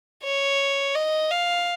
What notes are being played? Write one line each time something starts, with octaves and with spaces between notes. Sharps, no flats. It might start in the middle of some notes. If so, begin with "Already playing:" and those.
C#5
D#5
F5